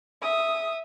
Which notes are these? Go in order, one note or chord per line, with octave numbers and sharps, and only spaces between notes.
E5 D#6